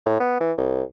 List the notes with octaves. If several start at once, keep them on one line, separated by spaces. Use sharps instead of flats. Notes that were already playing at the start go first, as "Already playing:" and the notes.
A2
B3
E3
C2